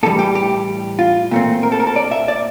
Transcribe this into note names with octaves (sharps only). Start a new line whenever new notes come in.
A2 E3 G3 A4
G4
G4
F4
A#2 A3 C4
A#4
A4
A#4
A4
D5
E5
D5